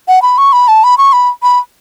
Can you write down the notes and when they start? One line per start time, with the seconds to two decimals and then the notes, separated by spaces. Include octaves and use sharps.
0.08 F#5
0.22 B5
0.38 C#6
0.53 B5
0.68 A5
0.84 B5
0.98 C#6
1.13 B5
1.43 B5